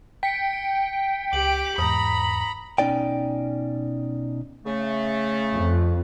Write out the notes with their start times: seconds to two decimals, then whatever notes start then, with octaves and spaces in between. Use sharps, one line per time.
0.23 G5 B6 C#7
1.33 C#2 G4 D6 F#7
1.78 E2 G#2 A#5 B5 D#6
2.78 B2 C#4 D#4 D5 G5
4.66 C#3 A3
5.53 F2